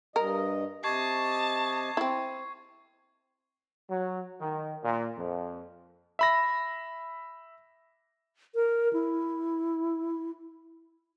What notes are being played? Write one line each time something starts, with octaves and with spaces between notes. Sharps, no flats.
G2 A#4 D#5
C3 G4 D#5 A5 C#6 G#6 C7
C4 E4
F#3
D#3
A#2
F2
E5 B5 A#6
A#4
E4